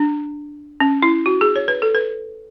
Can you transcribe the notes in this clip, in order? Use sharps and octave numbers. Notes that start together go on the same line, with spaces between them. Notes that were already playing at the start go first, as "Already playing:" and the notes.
Already playing: D4
C#4
E4
F#4
G#4
C#5
B4
A4
B4